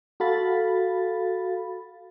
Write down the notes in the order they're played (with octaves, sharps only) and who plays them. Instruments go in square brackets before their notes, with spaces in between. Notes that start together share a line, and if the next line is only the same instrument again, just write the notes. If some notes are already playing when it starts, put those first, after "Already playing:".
[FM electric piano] F#4 A4 F5 B5 A6